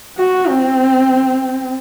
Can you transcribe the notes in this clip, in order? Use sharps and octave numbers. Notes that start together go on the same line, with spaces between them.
F#4
C4